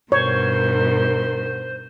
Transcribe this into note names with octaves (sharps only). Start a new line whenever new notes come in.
G2 B2 D#3 C5 C#5